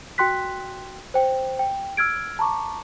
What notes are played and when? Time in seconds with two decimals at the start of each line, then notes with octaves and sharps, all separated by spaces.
0.18 F#4 G5 C6 F#6 B6
1.14 C5 G5
1.59 G5
1.97 E6 F6 G#6 D7
2.39 A5 A#5 C#6 D6